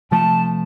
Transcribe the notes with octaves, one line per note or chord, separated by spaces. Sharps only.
C3 F3 A3 A5